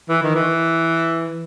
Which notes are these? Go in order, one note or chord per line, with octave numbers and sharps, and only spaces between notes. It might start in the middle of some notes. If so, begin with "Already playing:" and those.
E3
D#3
E3